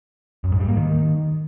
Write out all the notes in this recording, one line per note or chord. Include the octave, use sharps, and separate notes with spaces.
F#2
G#2
G3
A#3
D#3